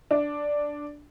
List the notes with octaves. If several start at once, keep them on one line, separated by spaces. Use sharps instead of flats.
D4